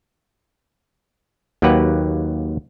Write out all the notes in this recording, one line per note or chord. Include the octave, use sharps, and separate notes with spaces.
D#2 F#3 A#3 G4 B4 F#5